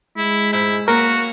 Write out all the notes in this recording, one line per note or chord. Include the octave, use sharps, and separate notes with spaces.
G#3 E4
G#2 E4
A#3 C#4 F#4 A#4